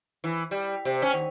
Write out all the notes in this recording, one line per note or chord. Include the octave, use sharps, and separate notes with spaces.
E3
G3
C3
C#4
D#2